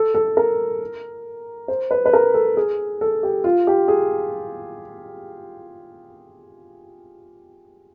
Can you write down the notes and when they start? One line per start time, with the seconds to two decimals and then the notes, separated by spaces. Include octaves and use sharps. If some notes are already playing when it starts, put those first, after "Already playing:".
Already playing: A4
0.14 A4
0.37 A#4
1.68 C5
1.91 B4
2.06 B4
2.13 A#4
2.34 A4
2.57 G#4
3.01 A4
3.23 G4
3.44 F4
3.67 G4
3.88 G#4